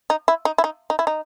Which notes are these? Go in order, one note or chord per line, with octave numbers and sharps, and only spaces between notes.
D#4
E4
D#4
E4
D#4
D#4
E4
D#4